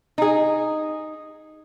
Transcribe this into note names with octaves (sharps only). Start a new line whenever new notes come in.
D#4 G#4